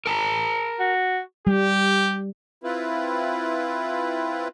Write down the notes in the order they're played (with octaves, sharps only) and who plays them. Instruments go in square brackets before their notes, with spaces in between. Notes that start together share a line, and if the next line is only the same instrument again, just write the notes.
[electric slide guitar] A#4 A5 A#5
[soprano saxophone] F#4
[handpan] G3 [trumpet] G4
[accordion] C4 E4 F4 B4